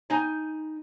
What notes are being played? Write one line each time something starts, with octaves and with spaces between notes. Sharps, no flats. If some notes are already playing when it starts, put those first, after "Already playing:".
D#4 G#5